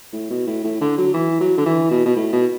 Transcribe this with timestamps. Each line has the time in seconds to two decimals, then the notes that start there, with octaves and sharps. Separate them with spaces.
0.13 A2
0.30 B2
0.47 A2
0.64 A2
0.81 D3
0.98 F#3
1.14 E3
1.41 F#3
1.58 D3
1.66 E3
1.91 B2
2.06 B2
2.16 A2
2.33 B2